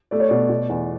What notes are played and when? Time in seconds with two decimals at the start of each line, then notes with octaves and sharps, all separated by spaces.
0.11 A3 D5
0.20 C#5
0.29 B2 D5
0.49 B2
0.69 E2